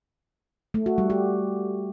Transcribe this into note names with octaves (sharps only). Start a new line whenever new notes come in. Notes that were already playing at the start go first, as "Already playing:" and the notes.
A3
F#4
G3
G4